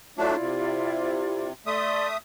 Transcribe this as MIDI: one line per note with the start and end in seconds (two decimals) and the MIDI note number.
0.18 0.36 54
0.18 0.36 57
0.18 0.36 62
0.18 1.49 64
0.18 1.49 65
0.18 1.49 74
0.40 1.53 48
1.66 2.17 57
1.66 2.08 74
1.66 2.17 76
1.66 2.08 84
1.66 2.17 87